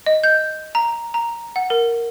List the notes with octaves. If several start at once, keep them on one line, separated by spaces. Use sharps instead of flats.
D#5
G6
A#5
A#5
F#5
A#4